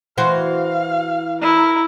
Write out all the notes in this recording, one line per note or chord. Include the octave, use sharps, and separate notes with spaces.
E3 F#4 C5 F5
E4 A#4